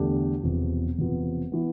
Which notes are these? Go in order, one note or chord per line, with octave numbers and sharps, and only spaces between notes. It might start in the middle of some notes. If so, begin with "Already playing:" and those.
Already playing: E2 D3 A3 D4 G4
E1 E2 C3 F3 B3
E1 E2 C3 F3 B3
E3 B3